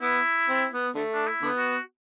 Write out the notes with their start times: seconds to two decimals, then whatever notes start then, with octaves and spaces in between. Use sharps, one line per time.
0.01 B3 E4
0.48 C4
0.72 B3
0.95 D3 A3
1.14 D4
1.27 E4
1.42 D3 B3
1.58 F#4